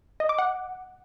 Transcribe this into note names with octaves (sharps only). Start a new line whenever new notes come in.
D#5
D6
F#5